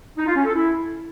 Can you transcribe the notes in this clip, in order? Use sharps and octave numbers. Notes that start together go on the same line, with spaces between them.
D#4
F4
C#4
A4
E4